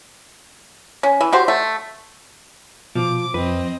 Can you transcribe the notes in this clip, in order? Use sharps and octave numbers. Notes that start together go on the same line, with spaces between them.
C#4
E3
F#4 G4 C5
A3
B2 F3 D6
F2 F3 C4 B4 D#5